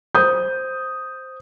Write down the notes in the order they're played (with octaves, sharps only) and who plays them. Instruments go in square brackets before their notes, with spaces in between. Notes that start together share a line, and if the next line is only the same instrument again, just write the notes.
[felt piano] C5 D#6 G6